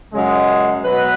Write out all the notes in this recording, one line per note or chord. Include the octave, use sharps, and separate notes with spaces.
F#2 C#3 G#3
B2 F#3 B4